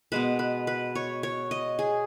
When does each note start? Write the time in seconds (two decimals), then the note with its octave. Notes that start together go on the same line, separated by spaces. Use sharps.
0.12 B2 G#3 B3 B4
0.39 B4
0.67 B4
0.95 C#5
1.23 C#5
1.51 D#5
1.79 G#4